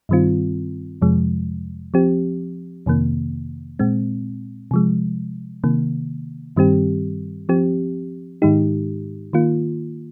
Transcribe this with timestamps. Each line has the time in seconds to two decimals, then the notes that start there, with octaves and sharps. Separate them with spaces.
0.09 G2 D#3 G3 C4 F4
1.02 F2 C3 F3 G#3
1.94 F3 C4 G4
2.86 F2 C3 D#3 A#3
3.79 A#2 G#3 C4
4.71 C3 F3 G#3
5.64 C3 D#3 A#3
6.56 G2 D#3 G3 C4 G4
7.49 F3 C4 G4
8.42 G#2 D#3 G#3 D#4 G4
9.33 D#3 A#3 F4